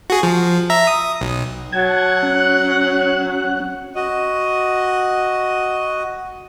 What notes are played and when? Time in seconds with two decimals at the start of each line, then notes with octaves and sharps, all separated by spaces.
0.10 F#4 G#4
0.23 F3
0.70 E5 A#5
0.87 D#6
1.21 B1
1.72 F#3 F#5 A5 G#6
2.23 C#4 F#6
3.95 F#4 D#5